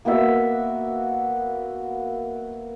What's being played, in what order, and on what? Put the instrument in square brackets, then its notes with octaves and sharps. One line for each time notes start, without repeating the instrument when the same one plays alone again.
[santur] A#3 B3 F#4 E5